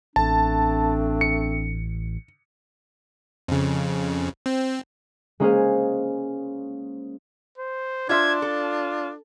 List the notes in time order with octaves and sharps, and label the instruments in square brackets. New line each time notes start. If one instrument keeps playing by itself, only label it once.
[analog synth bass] A1 [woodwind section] A3 C4 D4 [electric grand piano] A5
[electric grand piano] C#7
[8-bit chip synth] F2 C#3
C4
[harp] G#3 A#3 C#4 G#4 C5 F5
[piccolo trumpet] C5
[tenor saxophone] D4 [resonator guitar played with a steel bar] F4 C5 E5 [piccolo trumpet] G#6
[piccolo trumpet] F4 [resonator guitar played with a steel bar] A4